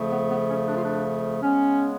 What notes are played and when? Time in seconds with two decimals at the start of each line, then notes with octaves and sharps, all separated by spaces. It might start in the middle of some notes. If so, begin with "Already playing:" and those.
Already playing: F2 C#3 F3 A3
0.11 B3
0.29 B3
0.49 C#4
0.68 D4
0.77 F4
0.85 D4
1.43 C#3 G#3 B3 C#4